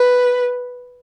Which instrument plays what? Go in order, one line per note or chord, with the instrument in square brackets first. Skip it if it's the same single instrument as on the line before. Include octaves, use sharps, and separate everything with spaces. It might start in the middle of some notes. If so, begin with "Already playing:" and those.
Already playing: [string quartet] B4